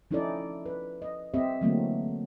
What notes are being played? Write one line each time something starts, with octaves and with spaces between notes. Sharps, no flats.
F3 C#4 D#4 E4 A4 D5
B4
D#5
C4 G4 D#5 E5
D3 E3 F#3 A3 A#3 C4